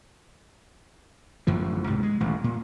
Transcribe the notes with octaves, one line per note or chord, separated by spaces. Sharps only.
A1 F#2 D3 F3
C#2 G#2 C3
G#3
D#1 A1
A#2